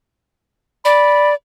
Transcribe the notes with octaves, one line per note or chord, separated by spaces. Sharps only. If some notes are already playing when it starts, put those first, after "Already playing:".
D5 B5